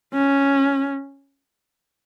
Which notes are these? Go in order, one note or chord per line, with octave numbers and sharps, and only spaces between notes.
C#4